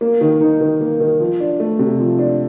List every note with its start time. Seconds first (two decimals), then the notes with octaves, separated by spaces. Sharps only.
0.01 A#3
0.21 D#3
0.41 D#4
0.61 D#3
0.81 A#3
1.00 D#3
1.20 F3
1.40 D4
1.60 A3
1.79 C3
2.00 F3
2.19 D4